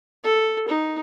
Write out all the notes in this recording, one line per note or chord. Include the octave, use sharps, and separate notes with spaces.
A4
D#4